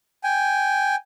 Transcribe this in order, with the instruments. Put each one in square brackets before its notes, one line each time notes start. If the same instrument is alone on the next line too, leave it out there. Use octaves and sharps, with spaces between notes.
[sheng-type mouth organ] G5 G#5